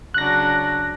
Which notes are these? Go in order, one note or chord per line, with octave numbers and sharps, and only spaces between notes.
C#3 F#3 D4 F#6 A#6